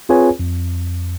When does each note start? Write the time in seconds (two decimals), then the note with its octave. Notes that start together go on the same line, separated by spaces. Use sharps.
0.09 C4 F4 G#4 B4 C#5 G#5
0.40 F2